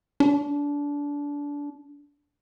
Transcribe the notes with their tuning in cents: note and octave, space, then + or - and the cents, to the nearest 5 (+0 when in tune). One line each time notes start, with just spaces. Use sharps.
D4 -25